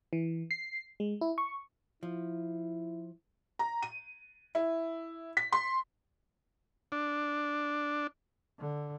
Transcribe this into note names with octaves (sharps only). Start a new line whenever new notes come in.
E3
C7
G#3
E4
C#6
F3 E4
A#5
D#7
E4
B6
C6
D4
D3